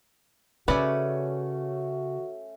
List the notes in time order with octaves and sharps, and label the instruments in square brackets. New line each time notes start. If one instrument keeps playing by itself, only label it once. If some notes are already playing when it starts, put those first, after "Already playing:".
[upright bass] C#3 [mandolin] A3 C#4 [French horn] F#4 [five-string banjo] B4 D5